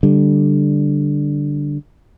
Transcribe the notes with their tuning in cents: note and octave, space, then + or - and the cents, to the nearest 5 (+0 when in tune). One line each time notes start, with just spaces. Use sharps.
D3 +0 G3 +0